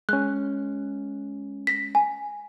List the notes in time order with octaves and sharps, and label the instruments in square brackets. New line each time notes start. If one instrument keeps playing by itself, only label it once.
[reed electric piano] G#3 C#4 [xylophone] F#6
[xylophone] A#6 B6
G#5